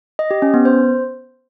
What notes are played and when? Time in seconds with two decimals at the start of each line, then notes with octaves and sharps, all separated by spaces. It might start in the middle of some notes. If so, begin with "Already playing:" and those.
0.19 D#5
0.31 G4
0.42 C#4
0.54 B3
0.65 C5